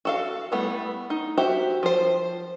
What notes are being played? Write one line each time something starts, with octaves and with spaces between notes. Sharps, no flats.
F#4 A4 F5
G3 A3 B3 E4
D#4
F#4 G4 C5 E5
F3 C5